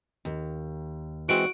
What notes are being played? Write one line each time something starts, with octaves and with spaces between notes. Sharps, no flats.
D#2
E3 G#3 C4 F#4 D7